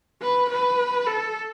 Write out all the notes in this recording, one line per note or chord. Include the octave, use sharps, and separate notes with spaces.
B4
B4
A4